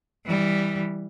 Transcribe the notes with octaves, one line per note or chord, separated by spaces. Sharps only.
E3 G3